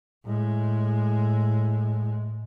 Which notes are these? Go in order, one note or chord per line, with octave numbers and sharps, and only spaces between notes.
A2 G#3